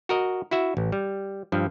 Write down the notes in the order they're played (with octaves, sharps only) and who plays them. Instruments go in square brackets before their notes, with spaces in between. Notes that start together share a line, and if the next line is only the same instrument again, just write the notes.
[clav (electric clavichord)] F#4 A#4 D#5
E4 F#4 E5
A1
G3
G2 F3